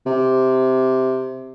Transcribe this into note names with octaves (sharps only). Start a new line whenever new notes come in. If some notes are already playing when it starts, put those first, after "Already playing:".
C3